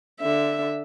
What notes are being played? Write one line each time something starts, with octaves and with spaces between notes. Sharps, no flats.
D3 E5